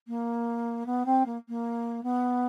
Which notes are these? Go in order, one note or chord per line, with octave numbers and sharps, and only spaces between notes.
A#3
B3
C4
A#3
A#3
B3